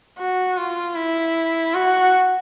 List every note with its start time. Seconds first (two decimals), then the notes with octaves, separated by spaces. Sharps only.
0.19 F#4
0.57 F4
0.95 E4
1.74 F#4